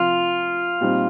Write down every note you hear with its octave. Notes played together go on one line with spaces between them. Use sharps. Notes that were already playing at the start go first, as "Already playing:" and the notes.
Already playing: C3 F3 C4 F4
A#2 G3 C4 D#4